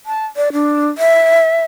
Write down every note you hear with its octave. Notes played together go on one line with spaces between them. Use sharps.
A5
D5
D4
E5